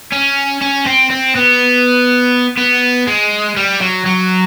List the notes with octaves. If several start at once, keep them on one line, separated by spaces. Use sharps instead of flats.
C#4
C#4
C4
C4
B3
B3
G#3
G3
F#3
F#3